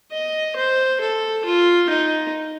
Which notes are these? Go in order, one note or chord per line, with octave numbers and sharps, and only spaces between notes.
D#5
C5
A4
F4
D#4